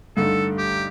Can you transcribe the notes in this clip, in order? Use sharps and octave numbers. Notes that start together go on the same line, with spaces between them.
G2 D3 A3 D#4 A4
G4